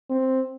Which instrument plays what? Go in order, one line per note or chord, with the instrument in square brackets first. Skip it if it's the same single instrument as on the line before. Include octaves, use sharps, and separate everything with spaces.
[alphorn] C4